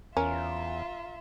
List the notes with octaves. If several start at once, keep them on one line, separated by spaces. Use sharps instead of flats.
E2 C#4 F4 A#4 E5